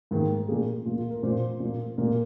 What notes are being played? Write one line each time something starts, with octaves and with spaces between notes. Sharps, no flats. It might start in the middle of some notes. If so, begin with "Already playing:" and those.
G#2 D#3 A#3
A#2 A#3 G#4
A#2 A#3 F4
F4
A#4
A#2 A#3 C5
A#2
A#3
A#2 A#3 A#4